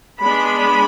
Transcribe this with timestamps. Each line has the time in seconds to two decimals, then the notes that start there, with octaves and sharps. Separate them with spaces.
0.20 G#3 B3 D4 B5